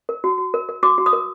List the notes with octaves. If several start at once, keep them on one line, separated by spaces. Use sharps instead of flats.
A#4
F#4
F#4
A#4
A#4
F#4 D6
F#4
D#6
A#4